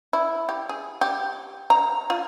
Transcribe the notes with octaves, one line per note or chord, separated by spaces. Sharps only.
E4
G4
G#4
G4
A#5
F4